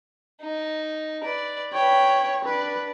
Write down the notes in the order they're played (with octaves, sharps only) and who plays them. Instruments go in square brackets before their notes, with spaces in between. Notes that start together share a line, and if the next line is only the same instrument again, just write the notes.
[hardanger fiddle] D#4
B4 D5
[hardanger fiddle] B4 G5 [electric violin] C#5
[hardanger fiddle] D4 D5 [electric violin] B4